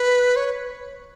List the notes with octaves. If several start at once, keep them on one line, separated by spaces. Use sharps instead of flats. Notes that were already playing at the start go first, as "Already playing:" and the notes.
Already playing: B4
C#5